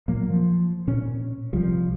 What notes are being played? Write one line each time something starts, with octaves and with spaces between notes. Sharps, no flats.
A#2 F#3 A#3
F3
A#2 C#4
C2 F3 G3